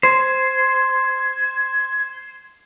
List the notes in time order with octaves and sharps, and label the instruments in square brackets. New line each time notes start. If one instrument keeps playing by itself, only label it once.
[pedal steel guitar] C5 [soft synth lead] G#6